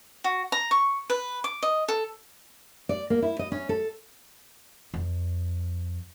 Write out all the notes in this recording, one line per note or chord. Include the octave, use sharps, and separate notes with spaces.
F#4
A#5
C#6
B4
D6
D#5
A4
D5
A#3
E4
D#5
C#4
A4
F2